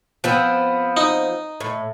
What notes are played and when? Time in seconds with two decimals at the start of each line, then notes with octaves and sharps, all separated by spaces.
0.24 F3 B3 C4
0.97 D#4
1.61 A2